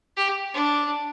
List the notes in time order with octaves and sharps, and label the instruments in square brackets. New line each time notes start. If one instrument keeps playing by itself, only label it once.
[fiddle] G4
D4